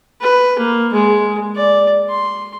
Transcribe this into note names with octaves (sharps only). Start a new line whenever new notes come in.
B4
A#3
G#3
D5
C6